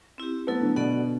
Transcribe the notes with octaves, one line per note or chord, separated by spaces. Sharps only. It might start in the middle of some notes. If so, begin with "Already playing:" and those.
C4 E4 G4
F#3 A3 B3 E4 A4
D3
B2 B3 F#4 A4 D5 F#5